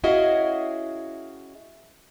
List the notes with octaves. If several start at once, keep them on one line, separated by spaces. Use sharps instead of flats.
C#4 E4 F#4 G#4 D#5 F5